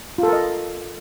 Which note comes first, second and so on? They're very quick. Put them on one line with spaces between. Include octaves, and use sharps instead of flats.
F4 A4 A#4 D#5